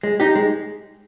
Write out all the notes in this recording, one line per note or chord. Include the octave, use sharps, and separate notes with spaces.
G#3
D#4 G4
G#3